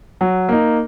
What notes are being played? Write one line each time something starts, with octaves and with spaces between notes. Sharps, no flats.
F#3
A#3 D#4